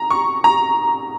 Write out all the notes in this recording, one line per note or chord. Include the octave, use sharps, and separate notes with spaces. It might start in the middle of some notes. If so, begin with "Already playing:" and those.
Already playing: A#5
C#6
A#5